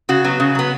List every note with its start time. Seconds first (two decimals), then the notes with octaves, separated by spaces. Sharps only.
0.09 C#3 F#4
0.24 F#3 B3
0.40 C#3
0.55 F#3 B3